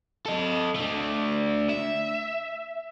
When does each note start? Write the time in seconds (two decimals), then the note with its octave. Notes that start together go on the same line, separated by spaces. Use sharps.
0.26 A4 D#5
0.75 A3 D4
1.69 E5